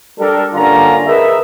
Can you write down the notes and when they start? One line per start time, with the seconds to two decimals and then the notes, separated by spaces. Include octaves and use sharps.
0.20 G3 D4 A4 A#4
0.55 G2 D3 A#3 C#4 F4 A#5
1.07 G#4 A#4 B4 D#5 E5